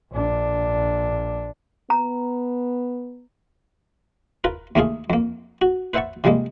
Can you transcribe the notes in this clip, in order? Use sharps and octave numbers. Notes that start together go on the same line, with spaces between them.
A#1 D4
B3 A#5
F4 A#4 B4
D#2 A3 A#3 F4 G#4 F5
F2 A#3
F#4
B4 C5 E5 F#5 A5 C#6
C3 F3 G3 G#3 A#3